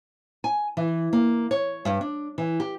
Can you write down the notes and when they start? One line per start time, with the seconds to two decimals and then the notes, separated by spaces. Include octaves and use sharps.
0.44 G#5
0.77 E3
1.13 A#3
1.51 C#5
1.85 G2
2.01 D4
2.38 E3
2.60 G4